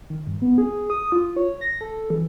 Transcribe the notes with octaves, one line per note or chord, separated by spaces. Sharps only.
D#3
G2
B3
G#4
D#6
F4
C#5
A#6
A4
E3